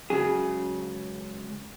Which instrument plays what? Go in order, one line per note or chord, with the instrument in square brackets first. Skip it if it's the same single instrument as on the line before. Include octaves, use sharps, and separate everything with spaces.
[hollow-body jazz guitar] C#2 C#3 F#3 G#4